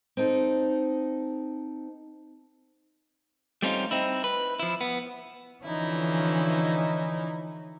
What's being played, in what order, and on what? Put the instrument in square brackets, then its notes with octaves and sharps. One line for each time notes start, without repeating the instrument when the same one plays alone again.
[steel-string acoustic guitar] C4 D#4 A4
[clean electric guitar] G3 A3 C4 C#4 D#4 F4
C4 D#4 E4
B4
F3 E4
B3
[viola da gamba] D3 F3 A4 [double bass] E3 C#4 [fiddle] D#4 E4